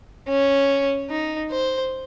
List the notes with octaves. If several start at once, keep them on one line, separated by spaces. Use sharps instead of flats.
C#4
D#4
C5